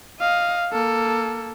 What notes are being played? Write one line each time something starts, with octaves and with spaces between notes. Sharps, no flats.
D#5 F5
A#3 A4